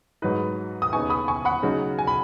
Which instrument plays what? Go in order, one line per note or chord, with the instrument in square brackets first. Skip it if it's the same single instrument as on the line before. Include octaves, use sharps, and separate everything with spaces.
[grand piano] G#2 F#3 D#4 B4
D#6
D#2 C#3 B3 D#4 G#5 C#6
B5 D#6
G#5 C#6
F#5 B5
C#3 F#3 D#4
G#5
B5